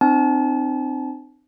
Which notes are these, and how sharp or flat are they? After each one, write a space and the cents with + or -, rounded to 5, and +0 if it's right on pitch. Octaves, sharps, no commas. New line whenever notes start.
C4 +0 D#4 -45 A5 -35